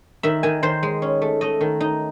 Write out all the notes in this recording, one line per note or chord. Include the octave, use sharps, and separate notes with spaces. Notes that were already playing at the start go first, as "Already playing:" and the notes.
D#3 E5
D#3 G#5
D#3 C5
G#3
C#4
A3
A3 D#5
D#3
D#4